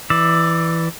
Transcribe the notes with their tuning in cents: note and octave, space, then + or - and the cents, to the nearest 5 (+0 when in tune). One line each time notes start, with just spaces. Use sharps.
E3 +0 D5 +15 E6 +0